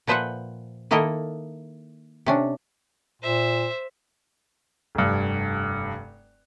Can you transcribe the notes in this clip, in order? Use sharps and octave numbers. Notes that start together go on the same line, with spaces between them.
A#2 F3 B4 C5 E5 F#5
D#3 A#3 E4 A4 A#4 D#5
C3 C#4 D4
A#2 C5 E5
F1 G2